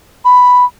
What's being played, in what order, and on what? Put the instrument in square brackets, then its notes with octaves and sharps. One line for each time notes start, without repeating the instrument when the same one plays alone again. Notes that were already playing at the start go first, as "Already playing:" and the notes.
[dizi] B5